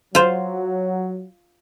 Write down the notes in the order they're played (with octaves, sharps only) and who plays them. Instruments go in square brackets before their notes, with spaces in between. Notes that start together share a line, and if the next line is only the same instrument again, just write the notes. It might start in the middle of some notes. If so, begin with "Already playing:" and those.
[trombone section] F#3 [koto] F4 C5